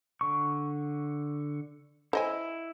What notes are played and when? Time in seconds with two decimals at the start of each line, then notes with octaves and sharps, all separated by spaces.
0.21 D3 C#6
2.13 E4 C5 D#5 G#5